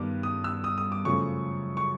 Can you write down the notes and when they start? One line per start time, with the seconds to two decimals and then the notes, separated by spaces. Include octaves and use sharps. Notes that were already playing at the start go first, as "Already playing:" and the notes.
Already playing: G2 D#3 G3 B3 D4 D6
0.23 D#6
0.44 E6
0.64 D#6
0.78 D#6
0.92 D6
1.05 F#2 C#3 F3 A3 C#6
1.77 C#6